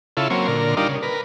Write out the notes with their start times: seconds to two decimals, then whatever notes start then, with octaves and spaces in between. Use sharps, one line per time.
0.17 C#3 E4 F4 A4
0.30 F#3 A#3 C4 C#4
0.48 A#2 D3 A#4
0.77 G3 D4 D#4 F4 A#4
0.88 C#3
1.03 A#4 B4